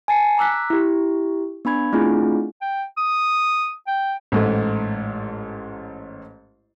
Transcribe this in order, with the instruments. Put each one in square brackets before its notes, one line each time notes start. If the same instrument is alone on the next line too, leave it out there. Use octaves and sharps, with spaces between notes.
[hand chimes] G#5 A5 A6 C7 C#7
A#5 D6 E6 F#6 B6
E4 G4
B3 D4 B5 G#6
A3 C4 D4 E4 F4 G#4
[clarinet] G5
D#6
G5
[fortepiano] A1 G#2 A3